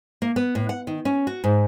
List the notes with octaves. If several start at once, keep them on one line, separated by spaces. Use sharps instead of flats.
A#3
B3
A2
F#5
D#3
C#4
F#4
G#2